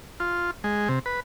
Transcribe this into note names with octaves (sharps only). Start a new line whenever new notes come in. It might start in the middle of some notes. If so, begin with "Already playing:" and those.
F4
G#3
C3
B4